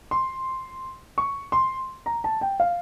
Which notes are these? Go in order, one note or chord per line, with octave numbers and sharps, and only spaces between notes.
C6
C#6
C6
A#5
A5
G5
F5